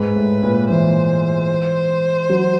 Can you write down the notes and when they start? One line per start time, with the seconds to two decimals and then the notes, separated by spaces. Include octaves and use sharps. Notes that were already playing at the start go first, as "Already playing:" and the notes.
Already playing: G#2 B4
0.16 A2
0.43 A#2
0.69 E3 C5
2.30 F#3